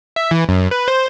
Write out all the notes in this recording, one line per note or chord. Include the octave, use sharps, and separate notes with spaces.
E5
E3
F#2
B4
C5